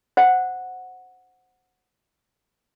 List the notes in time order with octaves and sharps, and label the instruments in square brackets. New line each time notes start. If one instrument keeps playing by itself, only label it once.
[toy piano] C5 F#5